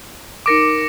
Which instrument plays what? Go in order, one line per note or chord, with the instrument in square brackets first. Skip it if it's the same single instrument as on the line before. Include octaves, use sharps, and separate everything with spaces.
[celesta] D#4 A#4 D7 [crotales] D6 A#6 C#7